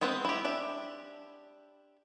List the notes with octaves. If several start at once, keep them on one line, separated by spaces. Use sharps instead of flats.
G#3 B3 C4 B4 C5
E4 G4
D4 G4 E5